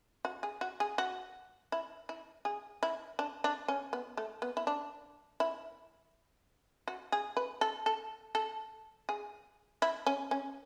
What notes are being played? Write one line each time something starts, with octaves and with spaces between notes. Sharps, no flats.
F#4
G#4
F#4
G#4
F#4
E4
E4
G#4
E4
D4
D4
C#4
B3
A3
B3
E4
D4
E4
F#4
G#4
B4
A4
A4
A4
G#4
E4
C#4
C#4